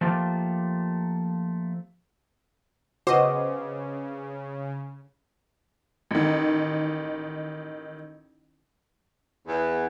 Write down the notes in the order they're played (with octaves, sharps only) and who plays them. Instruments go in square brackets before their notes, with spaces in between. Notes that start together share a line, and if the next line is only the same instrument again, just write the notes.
[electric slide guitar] F3 A3 A#3 F4 G4
[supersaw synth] C#3 [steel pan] F#4 [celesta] B4 D6 [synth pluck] C5 D#5
[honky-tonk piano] A1 D#3
[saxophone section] E2